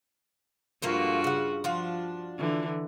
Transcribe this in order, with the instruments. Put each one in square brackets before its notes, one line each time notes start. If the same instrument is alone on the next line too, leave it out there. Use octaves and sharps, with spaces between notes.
[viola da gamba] G2 F4 F#4 [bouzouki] F3 A3 A#3
[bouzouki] C#3 F#5
[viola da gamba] F3 [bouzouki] D4 F4 F#4
[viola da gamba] D3 E3